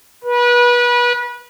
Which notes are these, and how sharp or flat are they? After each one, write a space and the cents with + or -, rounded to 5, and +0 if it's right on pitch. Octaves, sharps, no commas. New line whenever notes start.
B4 -30